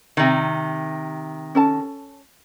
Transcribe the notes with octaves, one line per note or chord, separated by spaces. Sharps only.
C3 D#3
C#4 A4 A5